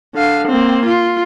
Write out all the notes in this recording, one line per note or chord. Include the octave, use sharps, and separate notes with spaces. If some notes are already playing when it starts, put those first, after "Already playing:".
D3 F5
A#3 C4
F4